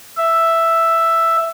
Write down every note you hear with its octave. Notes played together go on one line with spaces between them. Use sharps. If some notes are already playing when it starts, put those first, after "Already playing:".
E5